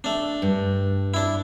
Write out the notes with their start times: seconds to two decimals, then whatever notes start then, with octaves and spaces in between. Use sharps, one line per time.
0.04 A3 D4
0.42 G2
1.14 D4 E4